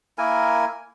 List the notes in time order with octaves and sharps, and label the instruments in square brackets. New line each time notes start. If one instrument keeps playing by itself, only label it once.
[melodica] A#3 E4 A#4 G#5